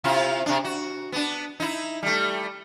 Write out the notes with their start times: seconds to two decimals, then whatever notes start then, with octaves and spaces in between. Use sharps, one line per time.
0.04 C3 E4 F4
0.46 C3 D4
0.64 F#4
1.12 B3 D4
1.60 D#4 E4
2.03 G3 A3